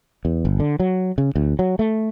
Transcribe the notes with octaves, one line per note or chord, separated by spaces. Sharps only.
E2
G1
D3
F#3
C#3
D2
F#3
A3